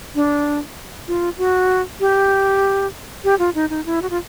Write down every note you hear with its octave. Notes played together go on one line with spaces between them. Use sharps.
D4
F4
F#4
G4
G4
F4
D#4
D#4
E4
F#4
F4